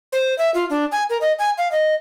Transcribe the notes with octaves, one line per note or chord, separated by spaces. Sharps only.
C5
E5
F4
D4
G#5
A#4
D#5
G#5
F5
D#5